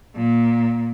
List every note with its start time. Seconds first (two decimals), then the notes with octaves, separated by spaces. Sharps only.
0.16 A#2